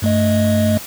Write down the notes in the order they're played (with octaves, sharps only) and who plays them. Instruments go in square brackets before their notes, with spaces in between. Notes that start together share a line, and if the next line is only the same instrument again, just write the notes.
[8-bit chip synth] G2 A3 D#5